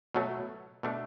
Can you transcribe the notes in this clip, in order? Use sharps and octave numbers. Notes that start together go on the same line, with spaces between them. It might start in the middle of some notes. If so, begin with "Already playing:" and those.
B2 F#3 A3
B2 A3 D4